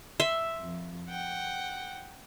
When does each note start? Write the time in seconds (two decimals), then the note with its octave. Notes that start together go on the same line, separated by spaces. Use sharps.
0.20 E5 C6
0.59 F2
1.07 F#5 G5